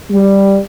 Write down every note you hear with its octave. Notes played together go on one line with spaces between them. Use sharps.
G3